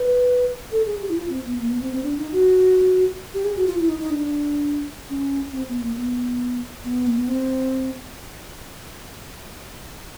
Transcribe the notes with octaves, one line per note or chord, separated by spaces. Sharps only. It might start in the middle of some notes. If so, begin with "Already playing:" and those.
Already playing: B4
A4
G#4
G4
E4
F4
C4
B3
A#3
B3
C4
C4
D4
D#4
F#4
G4
G#4
F#4
F4
E4
D#4
D#4
D4
C#4
C4
B3
A#3
B3
B3
A#3
B3
C4